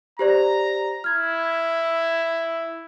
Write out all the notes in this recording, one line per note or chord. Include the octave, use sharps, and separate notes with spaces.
G4 C5 D5 A#5
E4 F6 G#6